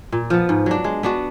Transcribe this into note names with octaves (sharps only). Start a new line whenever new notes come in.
A#2
F3 B3
G#2
F#3 D4
G#3
B3 D4 F#4